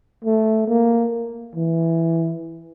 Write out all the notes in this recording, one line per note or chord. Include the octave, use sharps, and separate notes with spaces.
A3
A#3
E3